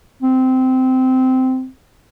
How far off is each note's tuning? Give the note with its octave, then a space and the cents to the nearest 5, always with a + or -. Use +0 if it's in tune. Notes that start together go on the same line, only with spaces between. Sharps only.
C4 -15